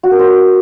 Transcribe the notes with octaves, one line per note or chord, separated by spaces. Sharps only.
F#4
A#4
C5